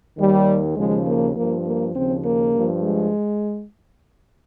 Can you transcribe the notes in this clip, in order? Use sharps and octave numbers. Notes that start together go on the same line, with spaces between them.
D#2 D#3 G3
D#2 C#3 F3 G#3
A#3
G2 F3 A#3
A#3
D#2 C#3 F3 C4
A#3
G2 F3
G#3